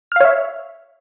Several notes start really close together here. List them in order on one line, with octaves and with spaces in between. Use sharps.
F6 F5 C#5 E5